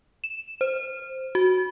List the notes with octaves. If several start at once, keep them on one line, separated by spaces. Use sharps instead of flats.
E7
C5
F#4